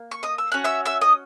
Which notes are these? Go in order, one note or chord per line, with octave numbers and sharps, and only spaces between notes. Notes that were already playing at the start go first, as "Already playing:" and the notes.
Already playing: A#3
C#6
D#5 D#6
E6
C#4 F#4 F#6
E5 E6
E5 E6
D#5 D#6